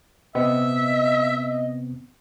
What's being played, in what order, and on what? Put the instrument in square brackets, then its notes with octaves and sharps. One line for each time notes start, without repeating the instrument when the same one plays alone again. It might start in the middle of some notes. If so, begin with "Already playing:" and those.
[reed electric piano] C3 B3 C4 [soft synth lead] D#5 [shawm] E5